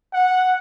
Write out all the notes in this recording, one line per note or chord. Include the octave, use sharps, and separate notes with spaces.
F#5